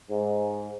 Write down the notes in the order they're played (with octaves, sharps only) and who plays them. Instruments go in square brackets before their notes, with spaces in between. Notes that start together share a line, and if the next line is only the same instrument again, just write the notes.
[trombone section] G#2